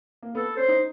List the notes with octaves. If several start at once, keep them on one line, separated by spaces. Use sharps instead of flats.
A#3
B3 A4
C#4 C5
D#4